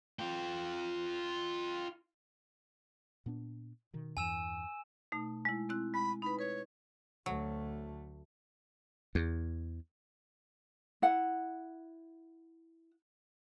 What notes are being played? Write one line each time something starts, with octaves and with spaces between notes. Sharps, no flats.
F4 G5
A#2 B3 D4
B2 D#3
E2 G2 E3 G#5 E6 E7
B2 A3 D#4
G#3 E4
C4 E4 F#6
G#3 B5
D#4 B4 B5
B4 C#5
D2 F#3 A3
E2
E4 F#5